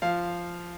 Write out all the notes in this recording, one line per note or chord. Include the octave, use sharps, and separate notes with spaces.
F3 F5